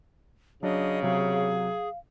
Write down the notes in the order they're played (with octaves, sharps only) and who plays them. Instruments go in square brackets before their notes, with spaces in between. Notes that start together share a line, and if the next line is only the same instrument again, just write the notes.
[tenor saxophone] C#3 [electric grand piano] F#3 D4 [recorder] D#5
[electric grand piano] C3 F#3 [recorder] G#4 [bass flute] F5